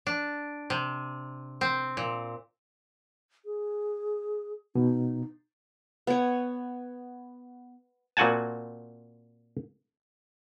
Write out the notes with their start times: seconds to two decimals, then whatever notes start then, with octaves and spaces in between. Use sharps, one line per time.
0.07 D4
0.70 C3
1.61 C4
1.97 A#2
3.45 G#4
4.75 B2 D#4
6.07 B3 C#5
8.17 A#2 C4 F#4 F#5 G#5 A5